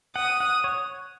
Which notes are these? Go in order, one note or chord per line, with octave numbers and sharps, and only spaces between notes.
F#5 D#6
F#5
C#5